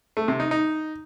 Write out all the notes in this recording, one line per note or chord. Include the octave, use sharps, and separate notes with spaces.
A3
C3
D#4
D#4